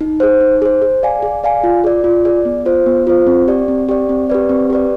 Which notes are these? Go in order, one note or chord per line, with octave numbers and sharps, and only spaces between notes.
D#4
G#4 C5
D#4
G#4 C5
G#4
D5 F5 G#5
G#4
D5 F5 G#5
F4
G#4 D5
F4
G#4 D5
B3
F4 C5
B3
F4 C5
C4
G4 D5
C4
G4 D5
C4
G4 B4 D5
C4
G4 B4 D5